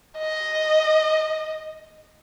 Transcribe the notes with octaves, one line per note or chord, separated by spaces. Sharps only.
D#5